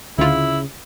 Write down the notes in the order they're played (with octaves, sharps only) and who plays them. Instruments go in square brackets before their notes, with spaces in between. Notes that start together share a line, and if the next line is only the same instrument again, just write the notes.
[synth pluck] D2 F4 [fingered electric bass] C#3 [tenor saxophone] E4